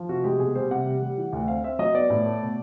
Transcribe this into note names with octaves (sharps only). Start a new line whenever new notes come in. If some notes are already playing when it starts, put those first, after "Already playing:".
Already playing: F3
C3 F#4
G#3 G4
B2 G#4
G3 C5
C3 F#5
G3
G3
E3
D2
C4 F5
C4 E5
F#3 D#5
B3 D5
A2
A3
B2